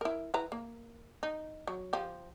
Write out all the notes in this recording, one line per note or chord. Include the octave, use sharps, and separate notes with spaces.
E4 A#4
E4 B4 A#5
A#3
D#4
F#3
F3 G4